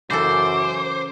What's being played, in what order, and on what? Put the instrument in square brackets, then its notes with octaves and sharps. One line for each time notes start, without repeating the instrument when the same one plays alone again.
[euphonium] F#2 [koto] C#3 E3 A4 [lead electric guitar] C5 [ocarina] D6